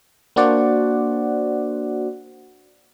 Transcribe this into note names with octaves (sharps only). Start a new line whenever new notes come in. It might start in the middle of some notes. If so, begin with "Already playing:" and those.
A#3 D4 F#4 C5 D5 F#5